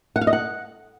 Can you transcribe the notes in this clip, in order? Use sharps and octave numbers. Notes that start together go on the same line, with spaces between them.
F#5
F5
D#5
F#5